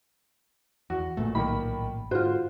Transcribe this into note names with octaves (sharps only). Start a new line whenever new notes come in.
E2 F#4
A1 A#2 A3
B1 D#3 A#3 B5
G#2 D3 F4 F#4 C5